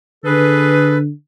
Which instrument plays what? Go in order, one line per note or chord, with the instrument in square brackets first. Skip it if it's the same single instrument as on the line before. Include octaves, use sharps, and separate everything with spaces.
[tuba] D3 [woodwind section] G#4 A4 B4